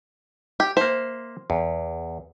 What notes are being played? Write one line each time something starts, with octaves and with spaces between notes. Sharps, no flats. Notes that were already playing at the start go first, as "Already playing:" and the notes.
G4
A#3 C5 E5
E2